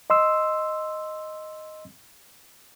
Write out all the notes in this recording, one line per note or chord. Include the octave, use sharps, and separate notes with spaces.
D#5 C6 E6